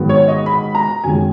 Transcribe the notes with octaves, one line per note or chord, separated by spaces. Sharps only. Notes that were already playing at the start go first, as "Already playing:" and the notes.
Already playing: G#2 D#3 F#3 B3
C#5
D#5
B5
A#5
F#2 D#3 G#3 G#5